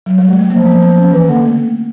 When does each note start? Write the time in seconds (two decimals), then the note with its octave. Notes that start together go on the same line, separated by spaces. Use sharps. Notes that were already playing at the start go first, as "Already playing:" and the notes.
0.06 F#3
0.18 G3
0.28 G#3
0.39 A3
0.50 F3 A#3
0.65 B3
0.81 C4
0.97 C#4
1.13 E3 C4
1.29 D3 A#3
1.45 A3